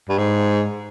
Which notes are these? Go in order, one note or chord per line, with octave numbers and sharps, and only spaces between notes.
G2
G#2